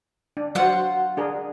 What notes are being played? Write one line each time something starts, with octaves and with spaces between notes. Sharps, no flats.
D4
F#3 F4 F#4 C5 F#5
D4 G#4 A#4